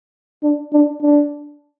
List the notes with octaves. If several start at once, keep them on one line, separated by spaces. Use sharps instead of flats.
D4
D4
D4